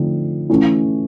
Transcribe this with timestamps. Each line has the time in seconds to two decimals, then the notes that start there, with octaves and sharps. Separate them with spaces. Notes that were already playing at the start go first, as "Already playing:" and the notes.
Already playing: D3 F3 A3 C4 D#4
0.50 E3 A3 C#4 E4